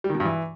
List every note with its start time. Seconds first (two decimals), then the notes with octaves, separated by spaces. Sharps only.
0.04 G3
0.10 D#3
0.15 B2
0.20 G2
0.25 E3